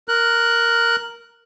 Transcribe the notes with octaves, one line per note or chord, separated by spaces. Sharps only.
A#4 F#6